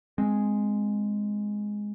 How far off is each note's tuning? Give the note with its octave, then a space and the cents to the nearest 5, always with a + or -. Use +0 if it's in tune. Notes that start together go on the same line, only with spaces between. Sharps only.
G#3 +0 C4 +0